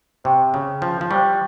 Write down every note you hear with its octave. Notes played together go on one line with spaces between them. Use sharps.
C3 C5 G5 C#6
C#3
F3
F3
G3 C5 G5 C#6